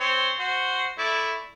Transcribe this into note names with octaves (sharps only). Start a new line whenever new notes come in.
C4 C5 C#5
F#4 C5
A3 E4 D5